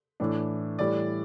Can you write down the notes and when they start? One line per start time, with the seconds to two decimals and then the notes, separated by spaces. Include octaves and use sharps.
0.20 A2 E3 A3 D4
0.79 A2 E3 G3 D5